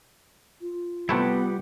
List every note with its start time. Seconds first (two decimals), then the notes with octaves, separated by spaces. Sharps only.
0.61 F4
1.09 C3 G3 A3 B3 E4 G4 F#5